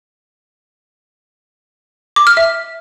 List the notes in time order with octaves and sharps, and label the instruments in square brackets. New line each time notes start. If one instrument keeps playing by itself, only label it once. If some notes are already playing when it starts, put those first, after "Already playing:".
[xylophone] D6
F6
E5